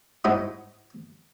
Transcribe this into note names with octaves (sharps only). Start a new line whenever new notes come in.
G#2 G#3 E4 F#5 B5 D#6